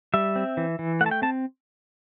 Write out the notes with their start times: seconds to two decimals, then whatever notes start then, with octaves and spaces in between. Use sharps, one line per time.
0.14 G3 E5
0.36 C4
0.57 E3
0.79 E3
1.01 A3 F#5
1.06 A5
1.11 G5
1.22 C4 A5